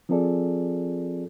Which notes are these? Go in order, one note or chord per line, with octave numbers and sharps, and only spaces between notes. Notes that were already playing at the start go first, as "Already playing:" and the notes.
F3 C4 F4 G#4 A4 D5